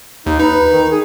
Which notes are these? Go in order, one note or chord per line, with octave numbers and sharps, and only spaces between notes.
D#2 D#4
D#4 B4
D#3
G#4